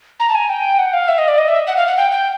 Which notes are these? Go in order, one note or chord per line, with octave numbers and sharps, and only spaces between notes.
A#5
A5
G#5
G5
F#5
F5
E5
D#5
D5
D#5
E5
F#5
F5
F#5
G5
G5